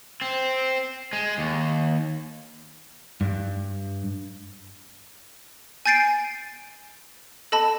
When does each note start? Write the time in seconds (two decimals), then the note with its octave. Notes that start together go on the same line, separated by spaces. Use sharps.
0.21 C4
1.13 G#3
1.38 D#2
3.21 G2
5.86 G#5 G6 A6 C7 D7
7.52 A4 D#5 A5 B5